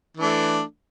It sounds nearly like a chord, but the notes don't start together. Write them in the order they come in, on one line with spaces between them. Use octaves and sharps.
E3 D4 A3